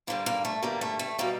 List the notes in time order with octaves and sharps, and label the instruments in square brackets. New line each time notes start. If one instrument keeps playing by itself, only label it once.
[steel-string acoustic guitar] G2 D3 G3 A#3
A#3
A3
G2 D3 G3 A#3
A3
A3
B2 G3 A#3